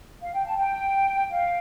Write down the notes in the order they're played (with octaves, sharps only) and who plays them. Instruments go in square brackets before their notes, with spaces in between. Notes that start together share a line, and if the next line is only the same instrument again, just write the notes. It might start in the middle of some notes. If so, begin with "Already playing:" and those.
[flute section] F5
G5
A5
G5
F5